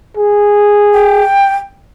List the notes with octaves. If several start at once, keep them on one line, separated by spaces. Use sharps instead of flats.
G#4
G5